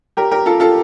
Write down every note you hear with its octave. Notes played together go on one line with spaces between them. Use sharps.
G4 A#4
G4 A#4
F4 A4
F4 A4